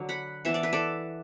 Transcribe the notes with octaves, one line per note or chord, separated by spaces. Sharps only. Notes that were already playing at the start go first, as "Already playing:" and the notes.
Already playing: D3 F#3 D4
F#5 B5
E3 B3 D4 E5
D5
B4
A4 D5